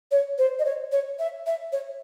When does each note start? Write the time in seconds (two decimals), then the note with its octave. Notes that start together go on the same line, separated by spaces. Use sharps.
0.11 C#5
0.38 C5
0.59 D#5
0.65 C#5
0.92 C#5
1.19 E5
1.46 E5
1.72 C#5